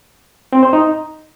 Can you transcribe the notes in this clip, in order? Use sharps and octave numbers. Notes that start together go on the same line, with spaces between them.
C4
C5
D#4